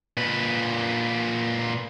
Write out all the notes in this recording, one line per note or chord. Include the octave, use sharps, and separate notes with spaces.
A#2 B4